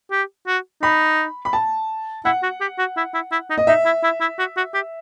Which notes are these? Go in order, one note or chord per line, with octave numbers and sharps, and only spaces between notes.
G4
F#4
D#4 B5
B5
A5
E4 F#5
F#4
G4
F#4
E4
E4
E4
D#4
D#5
D#4 E5
E4
E4
E4
F#4
F#4
G4